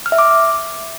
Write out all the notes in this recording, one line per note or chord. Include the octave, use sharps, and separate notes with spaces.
F6
E5
D6